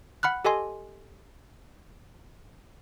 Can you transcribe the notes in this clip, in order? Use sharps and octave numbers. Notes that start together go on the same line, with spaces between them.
F#5 B5 F6 F#6
G4 A4 D#5 G#5 C6